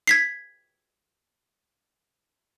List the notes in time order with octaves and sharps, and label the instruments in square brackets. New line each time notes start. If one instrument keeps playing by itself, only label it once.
[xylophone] G#6 B6 C7